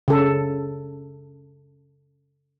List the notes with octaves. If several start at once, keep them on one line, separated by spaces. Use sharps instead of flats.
C#3 A4